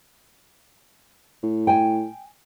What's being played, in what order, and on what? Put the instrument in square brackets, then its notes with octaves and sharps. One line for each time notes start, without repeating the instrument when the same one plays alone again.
[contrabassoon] A2
[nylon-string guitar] G5 G#5